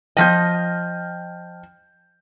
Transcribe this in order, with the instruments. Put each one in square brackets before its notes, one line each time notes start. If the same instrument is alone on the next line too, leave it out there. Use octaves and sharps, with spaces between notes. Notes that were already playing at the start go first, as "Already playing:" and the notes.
[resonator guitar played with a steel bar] F3 D#5 [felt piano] G5 F6 G6